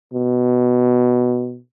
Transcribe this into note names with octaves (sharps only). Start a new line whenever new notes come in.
B2